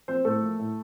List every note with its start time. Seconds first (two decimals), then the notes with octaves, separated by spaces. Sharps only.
0.08 F3 A#3 C4 C5
0.25 A2 A3 A4
0.42 F3 A#3
0.59 A2